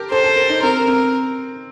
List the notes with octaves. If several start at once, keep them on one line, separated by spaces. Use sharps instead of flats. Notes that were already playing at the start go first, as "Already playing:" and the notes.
Already playing: G4 A4 A#4
A4 C5
A4
A#4
D#4
C4 A#4
C4